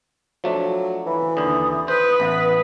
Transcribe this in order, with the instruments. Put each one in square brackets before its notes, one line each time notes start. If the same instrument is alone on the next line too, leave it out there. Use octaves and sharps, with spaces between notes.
[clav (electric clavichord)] F3 A3 D4 [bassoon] F#3
[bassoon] E3 [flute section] B5
[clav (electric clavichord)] D#2 D3 [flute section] D#6
[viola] B4 [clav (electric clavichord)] C5
[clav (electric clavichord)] A1 [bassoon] B3